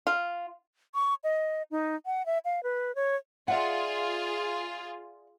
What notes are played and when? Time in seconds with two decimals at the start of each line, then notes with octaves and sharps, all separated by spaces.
0.07 F4
0.94 C#6
1.24 D#5
1.71 D#4
2.06 F#5
2.26 E5
2.45 F5
2.63 B4
2.95 C#5
3.48 F4 G#4 D5 E5 F#5